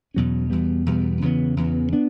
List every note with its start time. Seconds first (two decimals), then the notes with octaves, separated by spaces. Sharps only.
0.14 E2 B2 F#3 C#4
0.50 E2 B2 G3 B3
0.86 E2 B2 G3 B3
1.22 E2 C#3 E3 B3
1.57 E2 C#3 E3 B3
1.93 B3 D4